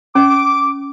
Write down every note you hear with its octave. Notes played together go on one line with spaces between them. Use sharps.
C#4 D6